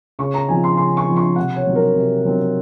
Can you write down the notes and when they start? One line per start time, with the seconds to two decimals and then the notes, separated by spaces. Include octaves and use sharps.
0.19 C#3 C#6
0.34 A#5
0.49 F3 C4 D#4 G#5
0.64 C6
0.77 C#3 C6
0.97 C#6
1.08 F3 C4 D#4
1.17 C#6
1.36 C3 F#5
1.56 C#5
1.66 F#3 C4 D#4
1.75 A#4
1.95 C3
2.25 F#3 C4 D#4